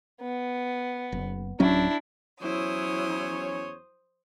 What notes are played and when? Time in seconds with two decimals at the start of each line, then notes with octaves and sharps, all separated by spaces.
0.21 B3
1.12 F#1
1.60 D1 F#3 C#4 D4 E4
2.41 E2 F#3 C#4 E4 C5 C#5 D#6